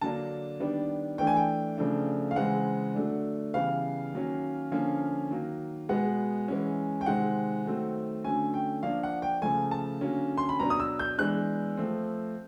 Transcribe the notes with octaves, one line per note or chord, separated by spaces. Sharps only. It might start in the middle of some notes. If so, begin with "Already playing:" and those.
D3 F#3 A#3 D4 A5
D#3 G3 B3 D4
E3 A3 D4 G5
G#5
G5
C#3 F3 A3 D4
F5
C#3 E3 G#3 C4 F#5
D3 F#3 A3 D4
C#3 E3 G3 B3 F5
D#3 F#3 A#3 C#4
D3 F3 A#3 C#4
D#3 F#3 A#3
B2 G#3 B3 F#5
E3 G#3 C#4
G5
C3 D#3 G#3 C4 F#5
D#3 F#3 A3 C4
D3 F#3 A3 C#4 G#5
G5
F3 A#3 D4 F5
F#5
G5
C#3 F3 A3 G#5
A5
D3 F#3 A#3 C#4
C6
B5
B2 F#3 B3 D4 A#5
D#6
E6
G6
E3 G#3 B3 D4 F#6
F3 A3 C4